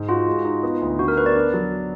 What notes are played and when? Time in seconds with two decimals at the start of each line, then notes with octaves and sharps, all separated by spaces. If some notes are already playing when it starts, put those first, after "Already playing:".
Already playing: G#2
0.08 F4 F#4
0.27 G#3
0.44 D#4
0.63 B3
0.81 D2
0.99 D3 F#4
1.08 A#4
1.17 B3 B4
1.26 D5
1.35 D4
1.53 F#3